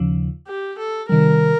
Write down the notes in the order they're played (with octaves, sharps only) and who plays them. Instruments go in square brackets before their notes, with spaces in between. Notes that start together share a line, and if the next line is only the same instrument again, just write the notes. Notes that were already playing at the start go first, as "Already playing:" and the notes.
Already playing: [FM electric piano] D#2 C#3 F3
[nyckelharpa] G4
A4
[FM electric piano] C3 D#3 G3 [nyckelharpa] A#4